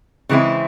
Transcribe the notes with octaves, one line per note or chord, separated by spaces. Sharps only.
C#3 E3 G#3 C4 E4